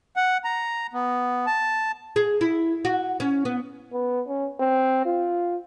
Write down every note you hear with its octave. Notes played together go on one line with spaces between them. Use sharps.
F#5
A#5
B3
A5
G#4
E4
F#4
C#4
B3
B3
C#4
C4
F4